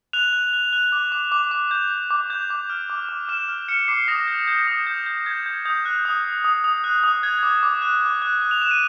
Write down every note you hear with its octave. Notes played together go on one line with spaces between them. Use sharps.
F#6 F7
F#6
F#6
F#6
D6
D6
D6
D6
G6
G6
D6
G6
D6
F6
D6
D6
F6 E7
F6
F6 C#7
D6 C7
D#6 A#6
G6
G6
D#6
G6
G6
G6 G#6
G6
D#6 G6
F#6
D#6
F#6
D#6
D#6
F#6
D#6
F#6 G#6
D6
D6
F#6
D6
F#6
F#6
F7
F#6 E7
D#7